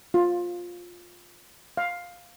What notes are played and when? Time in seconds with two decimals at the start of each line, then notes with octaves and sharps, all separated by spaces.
0.14 F4
1.77 F5